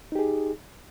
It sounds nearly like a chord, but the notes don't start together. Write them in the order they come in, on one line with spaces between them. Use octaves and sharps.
D#4 G4 G#4